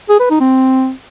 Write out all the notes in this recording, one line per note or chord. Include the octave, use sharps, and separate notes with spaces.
G#4
B4
D#4
C4